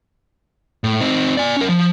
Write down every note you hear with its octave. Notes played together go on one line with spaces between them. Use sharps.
A2
C4 D#4
D5 G#5
C#4 A#4
F3